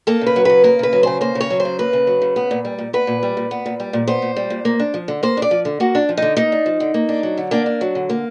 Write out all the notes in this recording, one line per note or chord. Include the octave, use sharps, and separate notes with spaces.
A#3 A4
C#3
B4
F#3
C#3 B4
A#3 A#4
C#3 B4
F#3
C#3 C5
A#3 C5
C#3
C#5
F#3
C5
C#3
A#3 B4
C#3
F#3
C#3
B3
A#2
G3
A#2
B3 B4
A#2
G3
A#2
B3
A#2
G3
A#2
B3 C5
A#2
G3
A#2
A#3
D4
F3
D3
A#3 C5
D4
D5
F3
D3
A#3 F#4
D4
F3
D3 D#4
A#3 D#4
D4
F3
D3
A#3
D4
F#3
D3
A#3 D4
D4
F#3
D3
A#3